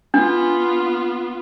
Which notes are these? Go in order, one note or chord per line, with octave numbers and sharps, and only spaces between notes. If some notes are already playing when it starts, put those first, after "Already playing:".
B3 D4 F4